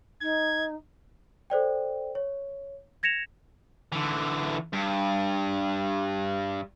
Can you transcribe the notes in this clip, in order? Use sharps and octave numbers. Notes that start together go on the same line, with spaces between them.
D#4 G#6
A4 C5 D5 G5
C#5
G#6 A#6 C#7 E7 F7
D3 E3
G2